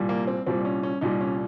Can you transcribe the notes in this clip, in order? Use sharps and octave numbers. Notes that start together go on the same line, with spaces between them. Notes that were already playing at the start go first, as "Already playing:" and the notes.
Already playing: C2 A#2 G3
A#3
C4
C2 A#2 G3 C4
C#4
C#4
C2 A#2 G3 D#4
C#4